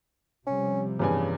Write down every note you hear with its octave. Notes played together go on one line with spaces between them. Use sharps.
C3 F3 G3 C#4
E2 G2 C#3 G#5